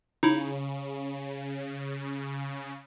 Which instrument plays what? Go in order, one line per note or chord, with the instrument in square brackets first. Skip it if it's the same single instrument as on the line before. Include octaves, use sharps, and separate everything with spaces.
[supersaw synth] C#3 [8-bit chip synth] D#4 E4